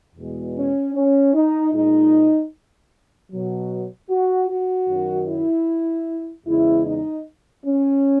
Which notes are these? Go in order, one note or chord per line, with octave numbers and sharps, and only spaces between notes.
E2 B2 G#3
C#4
C#4
D#4
A#2 G#3 D#4
B2 F#3
F#4
F#4
F#2 D#3 F#3
E4
E2 C#3 G#3 E4
D#4
C#4